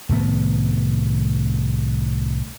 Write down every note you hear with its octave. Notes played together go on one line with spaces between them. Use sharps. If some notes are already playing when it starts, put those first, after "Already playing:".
C2 A2 D#3 B3